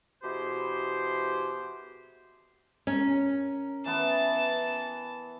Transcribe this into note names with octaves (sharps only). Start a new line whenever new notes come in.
B2 E3 G4 G#4 C5
C#4 A#4
E3 B3 A5